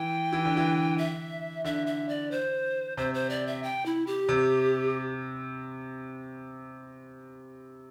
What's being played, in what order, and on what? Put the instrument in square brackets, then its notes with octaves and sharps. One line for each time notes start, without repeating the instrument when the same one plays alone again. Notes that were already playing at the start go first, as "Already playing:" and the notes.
Already playing: [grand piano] E3 [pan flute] G5
[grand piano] E3
D3
E3
[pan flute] E5
[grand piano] D3 [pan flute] E5
[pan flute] E5
D5
C5
[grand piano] C3 [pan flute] C5
[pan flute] C5
D5
E5
G5
E4
G4
[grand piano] C3